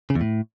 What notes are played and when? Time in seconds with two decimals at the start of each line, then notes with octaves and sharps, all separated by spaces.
0.10 C#3
0.15 E2
0.21 A2